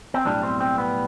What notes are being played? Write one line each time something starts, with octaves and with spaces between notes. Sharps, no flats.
C4
B1 A2 G3 D4
C4
C4
B3